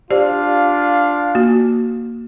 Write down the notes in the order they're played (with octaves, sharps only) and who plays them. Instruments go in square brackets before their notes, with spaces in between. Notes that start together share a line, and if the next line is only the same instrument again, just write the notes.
[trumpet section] D4 F4 F5 [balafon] G4 C5 D5
[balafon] A#3 F#4